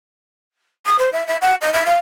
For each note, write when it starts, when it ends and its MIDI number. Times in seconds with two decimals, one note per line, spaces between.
0.86 0.96 87
0.99 1.10 72
1.13 1.27 76
1.27 1.37 76
1.42 1.55 78
1.61 1.70 75
1.73 1.83 76
1.86 1.98 77